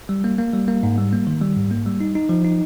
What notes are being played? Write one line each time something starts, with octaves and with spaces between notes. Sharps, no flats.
G3
A#3
A#3
G3
A#3
G#2
G3
A#3
D#3
G3
G#2
A#3
G3
D#4
D#4
F3
D#4